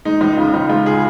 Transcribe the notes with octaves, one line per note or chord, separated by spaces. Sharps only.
G#3 D#4
C#2 D#4
C#3 F4
C#2 D#4
G#3 F4
G#4